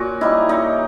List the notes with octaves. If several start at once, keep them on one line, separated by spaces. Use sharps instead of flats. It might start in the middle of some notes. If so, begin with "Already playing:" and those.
Already playing: A#2 C#4 F#4
G3 A#3 D#4 E4
A#2 D#4